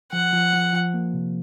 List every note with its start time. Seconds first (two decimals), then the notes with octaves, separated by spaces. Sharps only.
0.12 F3 F#5
0.33 F3
0.53 F3
0.73 F3
0.94 A#3
1.14 C3